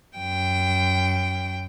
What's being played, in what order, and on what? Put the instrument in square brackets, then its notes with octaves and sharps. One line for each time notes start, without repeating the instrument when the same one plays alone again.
[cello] F#2 G5